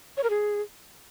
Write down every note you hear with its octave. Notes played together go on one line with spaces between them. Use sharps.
C#5
A#4
G#4